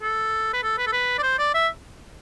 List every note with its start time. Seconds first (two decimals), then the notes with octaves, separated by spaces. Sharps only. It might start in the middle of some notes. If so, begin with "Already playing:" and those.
0.02 A4
0.53 B4
0.63 A4
0.78 B4
0.87 A4
0.93 B4
1.18 D5
1.23 C5
1.38 D5
1.54 E5